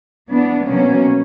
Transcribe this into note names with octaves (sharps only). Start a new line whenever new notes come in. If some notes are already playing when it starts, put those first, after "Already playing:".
E3 B3 D4
B2 F#3 A#3 C#4